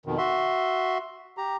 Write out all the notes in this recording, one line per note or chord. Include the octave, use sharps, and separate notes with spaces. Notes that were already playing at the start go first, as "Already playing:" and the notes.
F2 B2 D#3
F#4 E5 C6
G4 A#5